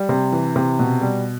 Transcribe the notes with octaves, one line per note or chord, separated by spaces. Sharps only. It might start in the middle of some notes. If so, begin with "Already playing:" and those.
Already playing: G3
C3
E3
C3
B2
G3